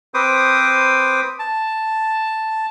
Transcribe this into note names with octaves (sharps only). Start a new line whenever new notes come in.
C4 B4 C5 D6 D#6
A5